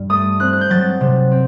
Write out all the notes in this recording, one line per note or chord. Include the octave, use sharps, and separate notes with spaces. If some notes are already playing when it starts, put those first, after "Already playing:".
Already playing: G2
A3 D#6
C4 F#6
F#6
G6
F#3 A6
C3
C4